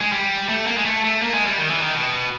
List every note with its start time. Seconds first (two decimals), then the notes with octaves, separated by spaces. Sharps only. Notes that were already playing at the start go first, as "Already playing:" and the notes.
0.01 G#3
0.12 G3
0.49 A3
0.67 A#3
0.77 G#3
0.85 A3
1.04 A3
1.22 A#3
1.34 G#3
1.46 G3
1.59 D#3
1.70 E3
1.82 D#3
1.95 B2